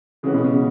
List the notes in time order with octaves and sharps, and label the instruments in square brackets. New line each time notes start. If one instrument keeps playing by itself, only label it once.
[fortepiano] C#3 [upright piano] E3 G#3 C#4 F#4 B4
[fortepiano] B2
C#3